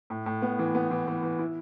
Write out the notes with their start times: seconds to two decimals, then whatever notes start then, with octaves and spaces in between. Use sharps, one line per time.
0.10 A2
0.26 A2
0.42 B3
0.59 E3
0.75 B3
0.91 E3
1.08 E3
1.23 E3
1.39 E4